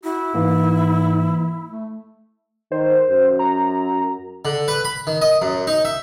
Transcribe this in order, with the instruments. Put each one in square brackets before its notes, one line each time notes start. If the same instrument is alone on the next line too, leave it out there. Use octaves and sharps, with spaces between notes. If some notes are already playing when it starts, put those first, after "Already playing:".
[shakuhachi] E4 [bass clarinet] F#4
[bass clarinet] G#2 [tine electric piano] E3 A#3
[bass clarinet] A3
[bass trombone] D#3 [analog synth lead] C5
[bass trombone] F#2
[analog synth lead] A#5
[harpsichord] D3
B4
B5
D#3
D#5
F#2
D#4
E5